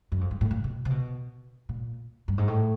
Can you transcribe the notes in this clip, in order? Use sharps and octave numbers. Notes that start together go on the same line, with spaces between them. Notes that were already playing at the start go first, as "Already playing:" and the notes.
F#2
F2
G#2
A2
A#2
B2
C3
B2
A#2
G2
G#2
A2